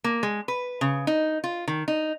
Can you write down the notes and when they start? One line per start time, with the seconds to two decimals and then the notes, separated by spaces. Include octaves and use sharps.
0.04 A#3
0.23 G#3
0.48 B4
0.81 C#3
1.07 D#4
1.44 F4
1.68 D#3
1.88 D#4